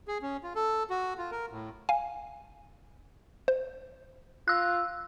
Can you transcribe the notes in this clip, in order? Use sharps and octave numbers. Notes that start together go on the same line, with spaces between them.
G#4
C#4
F4
A4
F#4
F4
A#4
A2
F5 G#5
C5
F4 E6 F#6